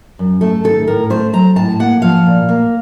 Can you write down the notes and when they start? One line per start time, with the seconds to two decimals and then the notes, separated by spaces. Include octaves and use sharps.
0.19 F#2
0.41 A3 A4
0.64 D#3 A4
0.87 A2 A#4
1.10 A3 C5
1.33 F#3 A#5
1.56 A2 A5
1.79 A#3 F#5
2.02 F3 F5
2.26 A#2
2.49 A#3